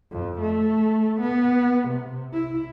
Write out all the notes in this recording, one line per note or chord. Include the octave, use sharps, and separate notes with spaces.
F2
A3
B3
C3
E4